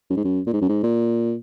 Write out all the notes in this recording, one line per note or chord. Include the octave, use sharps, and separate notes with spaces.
F#2
G#2
F#2
A#2
G#2
F#2
G#2
A#2